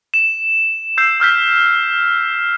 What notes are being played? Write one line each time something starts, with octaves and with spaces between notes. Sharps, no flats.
E7
E6 G6 C7
E6 F6 G6 B6